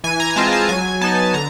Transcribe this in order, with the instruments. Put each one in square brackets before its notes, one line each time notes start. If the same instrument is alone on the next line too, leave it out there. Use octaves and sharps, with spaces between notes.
[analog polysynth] E3 G#5
A#5
A#5
G#3 C4 F4 A5
A5
F#3 G#5
B3 D#4 A5
D3 A#5